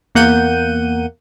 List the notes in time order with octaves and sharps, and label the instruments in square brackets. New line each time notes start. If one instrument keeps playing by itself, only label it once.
[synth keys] E2 A#3 F#5 G6 D#7